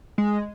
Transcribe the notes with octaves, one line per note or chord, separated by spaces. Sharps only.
G#3